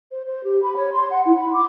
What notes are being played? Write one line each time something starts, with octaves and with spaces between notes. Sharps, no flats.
C5
C5
G4
B5
C#5
C6
F#5
E4
B5
D6